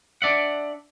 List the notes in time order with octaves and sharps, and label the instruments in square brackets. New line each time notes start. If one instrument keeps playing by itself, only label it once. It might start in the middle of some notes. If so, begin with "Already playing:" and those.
[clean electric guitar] D4 D5 E5 F#5